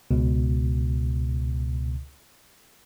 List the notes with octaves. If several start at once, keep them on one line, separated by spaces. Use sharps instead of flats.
C#2 B2